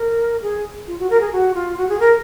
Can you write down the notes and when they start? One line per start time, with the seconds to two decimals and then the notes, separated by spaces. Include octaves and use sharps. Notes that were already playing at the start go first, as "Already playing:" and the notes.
Already playing: A#4
0.42 G#4
0.87 F4
0.99 F#4
1.10 A#4
1.21 G#4
1.32 F#4
1.54 F4
1.78 F#4
1.89 G#4
2.00 A#4